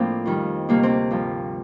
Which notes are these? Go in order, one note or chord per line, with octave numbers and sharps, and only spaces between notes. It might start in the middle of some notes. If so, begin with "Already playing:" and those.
Already playing: A2 F3 A#3 C4 D4
F2 D#3 G3
D2 C3 G3 A#3
C4
G2 F3